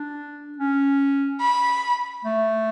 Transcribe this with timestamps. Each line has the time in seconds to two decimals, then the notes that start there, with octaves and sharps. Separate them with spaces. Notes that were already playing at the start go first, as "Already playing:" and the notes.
Already playing: D4
0.58 C#4
1.41 B5
2.25 A3